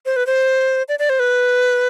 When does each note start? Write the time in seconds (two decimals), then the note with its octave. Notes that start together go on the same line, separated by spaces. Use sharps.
0.06 C5
0.16 B4
0.27 C5
0.89 D5
0.99 D5
1.09 C5
1.19 B4